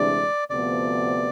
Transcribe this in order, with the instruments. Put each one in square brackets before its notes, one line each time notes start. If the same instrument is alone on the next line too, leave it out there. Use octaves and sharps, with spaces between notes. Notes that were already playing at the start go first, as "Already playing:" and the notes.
Already playing: [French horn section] D2 C3 E3 G#3 D4 [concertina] D5
[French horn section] D2 C3 F3 B3 D4 [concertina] D5